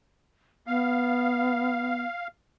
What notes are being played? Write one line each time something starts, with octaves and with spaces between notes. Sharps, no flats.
B3 F5